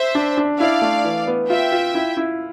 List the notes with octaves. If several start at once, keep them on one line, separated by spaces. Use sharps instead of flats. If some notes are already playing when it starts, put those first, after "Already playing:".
Already playing: C5 E5
D4
D4
E4 D5 F5
A3
E3
B3
F4 E5 G5
F4
E4
E4